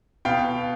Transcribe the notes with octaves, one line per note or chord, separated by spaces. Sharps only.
B2 F5 G5